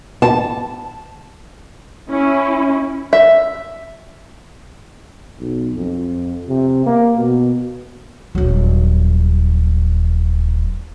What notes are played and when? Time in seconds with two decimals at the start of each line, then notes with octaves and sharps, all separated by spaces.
0.22 A5
2.09 C#4 E4
3.13 E5
5.39 B1
5.75 F2
6.48 C3
6.86 A#3
7.18 B2
8.35 D#1 F#3